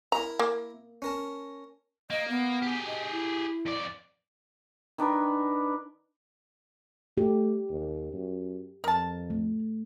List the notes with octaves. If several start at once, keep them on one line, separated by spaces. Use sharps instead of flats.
E4 A#4 E5 A#5
A#3
C#4 A#4 A5
A#3 D#5
B3
G4 G#4
D#5
E4
F2 D5
D#3 D4 D#4 B4
A3 G4
D#2
F#2
F2 A#4 A5
A3